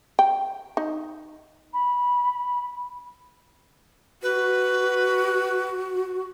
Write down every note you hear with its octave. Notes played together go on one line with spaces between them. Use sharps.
G5
D#4
B5
F#4 B4